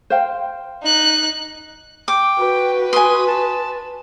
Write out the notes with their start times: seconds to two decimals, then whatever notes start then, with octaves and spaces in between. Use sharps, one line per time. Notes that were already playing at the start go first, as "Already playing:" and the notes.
0.10 C5 F5 G5
0.83 D#4 F#6
2.08 G5 D6
2.38 F#4 B4
2.93 G#5 C6 D#6
3.27 A5